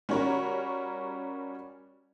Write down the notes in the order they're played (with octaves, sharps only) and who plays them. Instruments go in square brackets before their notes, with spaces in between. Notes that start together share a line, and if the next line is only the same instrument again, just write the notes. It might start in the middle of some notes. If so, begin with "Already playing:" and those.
[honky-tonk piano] G3 C#4 F#4 A#4 C#5